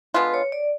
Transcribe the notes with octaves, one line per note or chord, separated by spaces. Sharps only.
D3 G#3 B3 F4 B4
C#5
D5